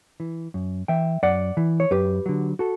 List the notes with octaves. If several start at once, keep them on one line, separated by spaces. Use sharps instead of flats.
E3
F#2
E3 E5 G5
F#2 D5 F#5
E3
C#5
F#2 G4 B4
D3 F#3
F#4 A4